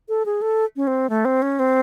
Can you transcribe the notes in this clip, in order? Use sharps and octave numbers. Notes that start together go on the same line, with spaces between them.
A4
G#4
A4
C#4
C4
A3
C4
C#4
C4